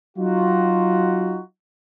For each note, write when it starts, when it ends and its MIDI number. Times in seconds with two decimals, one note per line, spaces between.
0.17 1.40 54
0.17 1.40 63
0.17 1.40 65
0.17 1.40 66